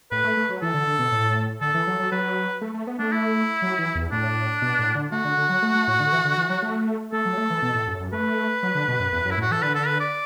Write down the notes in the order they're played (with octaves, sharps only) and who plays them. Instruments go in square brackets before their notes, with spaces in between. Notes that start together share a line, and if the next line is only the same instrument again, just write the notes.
[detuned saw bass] A2 [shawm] B4
[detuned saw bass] A3
A3
F#3
[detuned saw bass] E3 [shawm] A4
[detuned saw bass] D3
D3
B2
A2
[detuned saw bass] D3 [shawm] A4
[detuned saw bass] E3
F#3
F#3
[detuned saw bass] F#3 [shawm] B4
[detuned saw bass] A3
A3
B3
[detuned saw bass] A3 [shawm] D4
[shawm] E4
[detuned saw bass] F#3
E3
E2
[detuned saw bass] A2 [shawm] D4
[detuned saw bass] B2
A2
D3
[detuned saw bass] A3 [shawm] F#4
[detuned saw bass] D3
D3
F#3
A3
A3
A2
D3
E3
D3
E3
F#3
A3
[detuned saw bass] A3 [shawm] A4
[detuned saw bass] F#3
A3
E3
B2
A2
F#2
F#2
[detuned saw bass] A3 [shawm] B4
[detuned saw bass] F#3
D3
B2
F#2
E2
F#2
[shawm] E4
[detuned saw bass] A2
[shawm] F#4
[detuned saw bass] E3 [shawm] A4
[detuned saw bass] D3 [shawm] B4
[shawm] A4
B4
D5